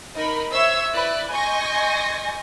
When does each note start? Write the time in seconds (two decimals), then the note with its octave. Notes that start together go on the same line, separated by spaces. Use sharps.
0.15 D#4 A#4 B5
0.52 C5 C#5 E5 E6 G#6
0.93 E4 B4 D5 F#6
1.32 D#5 G#5 C6 C#6 G6 A#6